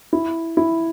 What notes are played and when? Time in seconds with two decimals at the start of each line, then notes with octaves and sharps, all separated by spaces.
0.13 E4
0.57 E4